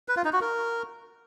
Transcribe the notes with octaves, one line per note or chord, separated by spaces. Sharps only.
B4
F4
D#4
F#4
A#4